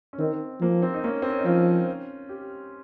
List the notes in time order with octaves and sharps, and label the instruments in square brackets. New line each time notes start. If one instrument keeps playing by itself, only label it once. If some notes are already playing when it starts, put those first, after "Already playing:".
[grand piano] C#4
[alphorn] D#3 [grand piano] C4 D#4
[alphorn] F3 [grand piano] A#3
[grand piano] C4
D#4
A#3 C#4
C4
C#4
D#4
[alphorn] F3 [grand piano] C#4 F4
[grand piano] G4